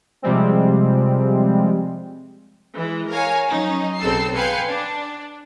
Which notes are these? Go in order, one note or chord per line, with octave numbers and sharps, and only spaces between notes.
C3 F3 G3 G#3 C4
E3 G#3
A#4 C#5 F5 G#5
F#3 C#4 D#4
B1 C#3 C4 A4 E6 C7
B4 F5 G5 G#5 C6 C#7
D4